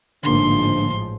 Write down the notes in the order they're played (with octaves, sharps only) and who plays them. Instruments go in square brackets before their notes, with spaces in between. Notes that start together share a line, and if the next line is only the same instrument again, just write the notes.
[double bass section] A1 G#2 F3 [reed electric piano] D3 A#3 [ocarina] D4 [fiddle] C6